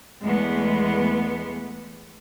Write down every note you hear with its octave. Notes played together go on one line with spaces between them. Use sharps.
E2 G#3 A3 B3